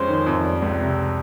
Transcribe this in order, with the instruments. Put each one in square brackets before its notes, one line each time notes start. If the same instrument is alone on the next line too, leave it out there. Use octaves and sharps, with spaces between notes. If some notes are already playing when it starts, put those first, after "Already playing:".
Already playing: [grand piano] F2 G#3 C#4 [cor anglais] C5
[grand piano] D#3
F2
G3
C#2
C3